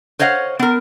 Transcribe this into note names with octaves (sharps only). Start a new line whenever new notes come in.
C5 C#5 D#5 F5 F#5
B3 A#4